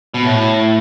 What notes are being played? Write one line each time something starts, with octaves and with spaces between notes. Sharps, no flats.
B2
A2